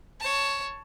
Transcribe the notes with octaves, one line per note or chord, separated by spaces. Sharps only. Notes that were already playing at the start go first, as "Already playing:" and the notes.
C#5 A5